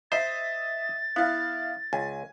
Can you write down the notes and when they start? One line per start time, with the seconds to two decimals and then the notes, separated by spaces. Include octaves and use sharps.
0.12 C5 D#5 E5 A6
1.16 B3 E4 F5
1.93 C#2 G#5